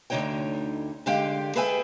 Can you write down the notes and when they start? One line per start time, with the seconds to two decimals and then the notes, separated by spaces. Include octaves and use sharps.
0.10 D2 D3 F3 D#4 C#5 G5
1.06 D3 G#3 G4 F5 G5
1.56 G#4 A4 B4 E5 G5 G#5